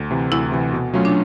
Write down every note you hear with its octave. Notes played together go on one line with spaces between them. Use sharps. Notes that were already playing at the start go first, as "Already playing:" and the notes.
Already playing: D2
C3 E3
D2 E4
C3 E3
B2
F#3 A3 C#4 F4
D4